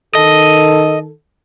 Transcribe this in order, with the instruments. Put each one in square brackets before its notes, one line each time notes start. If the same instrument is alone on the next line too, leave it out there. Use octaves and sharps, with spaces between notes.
[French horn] D#3 [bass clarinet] A4 [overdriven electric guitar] D#5